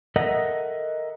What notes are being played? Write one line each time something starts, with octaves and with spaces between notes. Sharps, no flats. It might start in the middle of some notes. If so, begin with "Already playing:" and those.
A4 A#4 D#5 E5 F#5